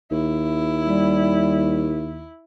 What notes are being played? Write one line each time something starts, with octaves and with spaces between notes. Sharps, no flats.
D#2 E4
G3